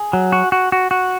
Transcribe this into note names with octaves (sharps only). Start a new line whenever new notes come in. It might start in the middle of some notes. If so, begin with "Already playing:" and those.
Already playing: G#4
F#3
F#4
F#4
F#4
F#4